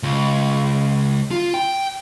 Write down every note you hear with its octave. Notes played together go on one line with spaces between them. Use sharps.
C#2
F4
G5